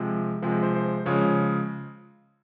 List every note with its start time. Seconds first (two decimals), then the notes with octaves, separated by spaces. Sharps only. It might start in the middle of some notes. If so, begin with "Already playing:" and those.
Already playing: C3 F3 G#3
0.42 C3 F3 G#3
0.63 C5
0.74 C5
1.06 C#3 F3 G#3 C#5